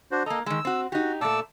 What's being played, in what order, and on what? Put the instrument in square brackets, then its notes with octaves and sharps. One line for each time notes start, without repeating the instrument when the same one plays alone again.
[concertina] D4 F#4 C5
[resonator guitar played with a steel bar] A#3 A#5 [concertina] A4 D#5
[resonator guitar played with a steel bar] D#3 G#3 [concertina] E6
[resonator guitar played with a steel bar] C4 F#4
[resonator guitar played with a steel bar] D#4 G4 [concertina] F#4
[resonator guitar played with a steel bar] A#2 A3 [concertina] D5 A5 E6